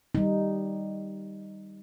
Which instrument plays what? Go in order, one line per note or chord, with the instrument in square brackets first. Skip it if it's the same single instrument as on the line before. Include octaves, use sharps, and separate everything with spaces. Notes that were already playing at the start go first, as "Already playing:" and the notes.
[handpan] G3 D#4